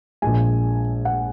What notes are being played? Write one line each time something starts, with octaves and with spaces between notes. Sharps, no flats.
A#1 A#2 G#3 G#5
F#5